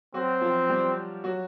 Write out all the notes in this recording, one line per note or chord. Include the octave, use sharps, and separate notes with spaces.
F#3 C4 F#4
F3 F4
G3 G4
F#3 F#4